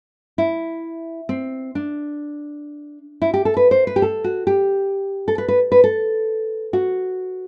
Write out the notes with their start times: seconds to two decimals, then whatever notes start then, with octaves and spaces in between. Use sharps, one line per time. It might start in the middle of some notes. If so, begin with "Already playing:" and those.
0.38 E4
1.29 C4
1.75 D4
3.22 E4
3.34 G4
3.45 A4
3.57 B4
3.71 C5
3.87 B4
3.96 G4
4.02 A4
4.24 F#4
4.47 G4
5.28 A4
5.38 B4
5.48 B4
5.72 B4
5.84 A4
6.73 F#4